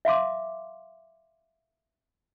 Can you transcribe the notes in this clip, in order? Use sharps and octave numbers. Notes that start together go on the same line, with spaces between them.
E5 F5 C6 D6